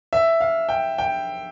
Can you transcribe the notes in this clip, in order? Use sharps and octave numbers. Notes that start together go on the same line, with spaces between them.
E5
F5
G5
G5